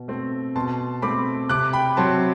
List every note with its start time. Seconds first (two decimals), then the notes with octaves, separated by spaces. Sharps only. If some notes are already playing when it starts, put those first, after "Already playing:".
Already playing: B2
0.08 A3 C4
0.56 B2 A5 C6
1.02 A3 C4 B5 D6
1.49 C3 D6 F#6
1.73 G5 B5
1.97 F#3 C4 A5 C6